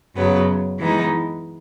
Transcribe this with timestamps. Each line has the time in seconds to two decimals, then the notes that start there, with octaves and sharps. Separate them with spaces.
0.16 F#2 C#3 F#3 B3
0.79 E3 G#3 B3 D#4